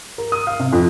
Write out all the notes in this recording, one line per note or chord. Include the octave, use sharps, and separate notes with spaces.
A#4
D#6
F5
C3
F2